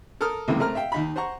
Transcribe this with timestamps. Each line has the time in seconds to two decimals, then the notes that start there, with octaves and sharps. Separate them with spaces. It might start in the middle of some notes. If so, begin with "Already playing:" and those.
0.21 A4 A#4 D#6 F6
0.48 C#2 F#2 C3 E3 A3 A#3
0.60 A3 C4 A#4 A#5 F6
0.75 E5 F5 G5
0.92 D#2 D#4 B5
1.16 C5 F#5 A#5 C#6